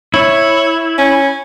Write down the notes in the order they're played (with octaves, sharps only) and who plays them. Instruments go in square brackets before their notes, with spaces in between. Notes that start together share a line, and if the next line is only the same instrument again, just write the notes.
[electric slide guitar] E4 [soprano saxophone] C#5
[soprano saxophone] C#4